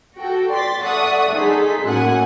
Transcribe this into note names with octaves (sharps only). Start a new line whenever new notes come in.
F#4 A4 G5
D5 C6 A6 B6
A4 D5 E5 F#5 C#6 D#6
D#4 G#4 A4 C6 B6
F#2 A2 A#3 F#5 G#5 F#6